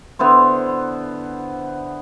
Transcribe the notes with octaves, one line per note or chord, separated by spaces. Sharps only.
D3 B3 E4 C5